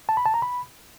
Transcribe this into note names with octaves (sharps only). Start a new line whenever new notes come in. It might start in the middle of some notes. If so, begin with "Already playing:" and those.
A5
B5
A5
A#5
B5